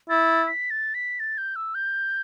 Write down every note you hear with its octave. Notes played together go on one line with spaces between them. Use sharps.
E4 A6
B6
A6
B6
A6
G6
E6
G6